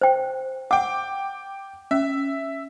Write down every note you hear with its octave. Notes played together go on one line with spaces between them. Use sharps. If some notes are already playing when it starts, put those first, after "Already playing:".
C5 G5
F#5 G5 D6
C#4 E5